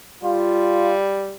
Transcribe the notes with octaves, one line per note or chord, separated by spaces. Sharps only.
G3 F4